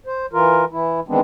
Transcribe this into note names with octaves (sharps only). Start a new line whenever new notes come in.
C5
E3 F4 A#4
E3 E4
D#3 E3 G#3 B3 C4 D4